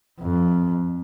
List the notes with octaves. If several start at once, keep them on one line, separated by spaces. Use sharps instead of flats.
F2